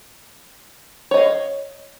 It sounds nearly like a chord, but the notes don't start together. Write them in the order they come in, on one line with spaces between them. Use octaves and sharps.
C#5 D#5 F5